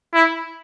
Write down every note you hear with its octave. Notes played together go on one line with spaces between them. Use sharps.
E4